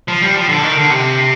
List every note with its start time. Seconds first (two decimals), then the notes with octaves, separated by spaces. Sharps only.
0.08 F3
0.22 G3
0.36 F3
0.49 D3
0.63 D#3
0.77 D3
0.90 C3